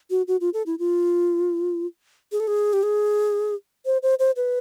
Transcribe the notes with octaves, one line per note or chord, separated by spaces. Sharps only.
F#4
F#4
F4
A4
E4
F4
G#4
A4
G#4
G4
G#4
C5
C5
C5
B4